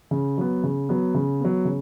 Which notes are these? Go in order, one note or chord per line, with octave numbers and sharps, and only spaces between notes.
C#3
F#3 B3
C#3
F#3 B3
C#3
F#3 B3
C#3